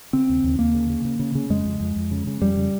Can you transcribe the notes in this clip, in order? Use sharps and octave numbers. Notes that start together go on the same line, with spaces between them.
C#3 C4
D#2
D#2
D#2 A#3
C#3
C#3
C#3
C#3
C#3
F2 G#3
F2
F2
F2
C#3
C#3
F2 G3
C#3